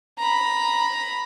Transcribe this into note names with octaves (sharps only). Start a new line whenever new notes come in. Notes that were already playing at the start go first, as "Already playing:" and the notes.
A#5 B5